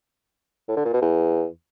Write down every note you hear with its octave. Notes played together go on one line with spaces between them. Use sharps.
A2
D3
A#2
B2
E2